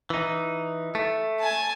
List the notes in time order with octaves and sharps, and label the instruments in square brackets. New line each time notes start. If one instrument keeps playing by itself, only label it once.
[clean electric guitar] E3 D#4
A3
[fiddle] G#5 A5